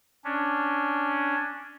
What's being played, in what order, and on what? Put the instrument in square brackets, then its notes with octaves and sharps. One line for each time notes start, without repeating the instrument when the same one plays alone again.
[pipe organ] C#4 D4